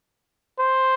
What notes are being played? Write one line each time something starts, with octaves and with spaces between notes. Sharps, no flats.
C5